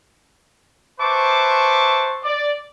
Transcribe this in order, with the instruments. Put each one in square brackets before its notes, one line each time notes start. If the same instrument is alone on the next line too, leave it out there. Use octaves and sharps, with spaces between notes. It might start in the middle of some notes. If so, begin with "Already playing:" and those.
[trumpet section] B4 C5 E5 A5 C#6 D6
D5